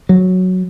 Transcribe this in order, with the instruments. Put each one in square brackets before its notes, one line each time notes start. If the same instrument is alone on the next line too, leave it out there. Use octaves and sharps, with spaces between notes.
[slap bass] F#3